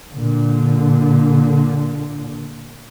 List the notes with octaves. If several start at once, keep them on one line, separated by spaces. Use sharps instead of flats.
A#2 D3